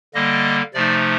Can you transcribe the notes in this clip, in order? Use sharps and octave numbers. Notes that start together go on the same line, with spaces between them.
D3 G3 A#3 D#5
C3 F3 A3 D#4 D5